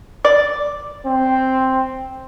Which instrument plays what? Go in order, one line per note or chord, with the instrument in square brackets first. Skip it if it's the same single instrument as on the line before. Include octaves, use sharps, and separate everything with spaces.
[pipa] D5
[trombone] C4